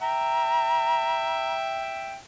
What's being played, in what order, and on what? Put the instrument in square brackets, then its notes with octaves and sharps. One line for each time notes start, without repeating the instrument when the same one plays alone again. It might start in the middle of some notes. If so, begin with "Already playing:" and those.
[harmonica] E5 G5 [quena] A#5